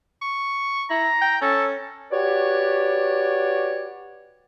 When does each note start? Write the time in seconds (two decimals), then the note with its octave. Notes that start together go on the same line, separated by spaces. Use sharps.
0.22 C#6
0.90 E4 A#5
1.22 G5
1.42 C#4 A4
2.11 F#4 G4 B4 C#5 D5